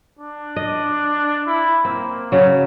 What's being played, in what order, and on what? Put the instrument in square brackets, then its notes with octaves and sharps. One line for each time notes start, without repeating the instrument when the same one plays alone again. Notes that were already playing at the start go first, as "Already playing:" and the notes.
[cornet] D4
[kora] D#5
[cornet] E4
[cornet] A#3 [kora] C4
[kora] C#3 F#3